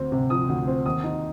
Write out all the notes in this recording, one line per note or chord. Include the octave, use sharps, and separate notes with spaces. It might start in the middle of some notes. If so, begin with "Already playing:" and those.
Already playing: D2 C4
C3
F3 D#6
D2
C4
D#2 D#6
D#4